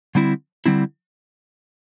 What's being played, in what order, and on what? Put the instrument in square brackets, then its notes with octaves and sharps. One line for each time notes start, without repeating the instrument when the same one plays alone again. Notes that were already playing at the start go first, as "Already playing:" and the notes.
[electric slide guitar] D3 G3 C4 E4
D3 G3 C4 E4